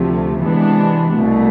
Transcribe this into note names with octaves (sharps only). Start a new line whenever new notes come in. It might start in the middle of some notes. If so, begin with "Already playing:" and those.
Already playing: D2 C3 F3 A3
C3 E3 G#3 B3 D4
C2 B2 A3